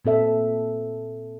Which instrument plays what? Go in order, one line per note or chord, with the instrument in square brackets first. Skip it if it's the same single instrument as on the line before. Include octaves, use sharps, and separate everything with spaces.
[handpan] A#2 C4 A4 E5